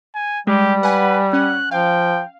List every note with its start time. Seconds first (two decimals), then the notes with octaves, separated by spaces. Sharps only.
0.15 G#5
0.47 G3 G#3 G4
0.83 B4 F#5 G#5 F#6
1.33 C#4 F#5 F#6
1.71 F3 F5 G5